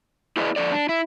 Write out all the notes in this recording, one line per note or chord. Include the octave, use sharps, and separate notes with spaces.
E4 G#4 B4 D5 D#5
F2 A4 D5
D4
E4